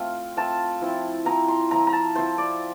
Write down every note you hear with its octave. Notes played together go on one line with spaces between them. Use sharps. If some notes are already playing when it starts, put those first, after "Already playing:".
Already playing: A3 C4 F4 F5
A3 C4 F4 A5
F3 C4 E4
F3 C4 E4 A#5
C6
F3 C4 E4 A#5
A#5
A5
F3 C4 E4 C5
D5